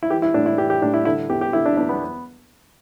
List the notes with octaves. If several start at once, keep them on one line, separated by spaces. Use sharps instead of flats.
E4
E3 G4
E4
A2 D4
E4
E3 G4
G4
A2 D4
E4
D3 E4
E2 G4
G4
D3 E4
D4
E2 D4
B3